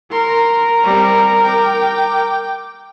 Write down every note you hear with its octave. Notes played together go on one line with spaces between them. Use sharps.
A#4 C6
G3 C4
G5 D6